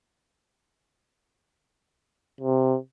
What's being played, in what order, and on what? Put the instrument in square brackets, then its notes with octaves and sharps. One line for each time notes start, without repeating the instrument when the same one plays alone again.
[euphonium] C3